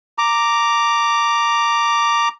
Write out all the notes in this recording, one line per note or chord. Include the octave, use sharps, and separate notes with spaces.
A#5 D6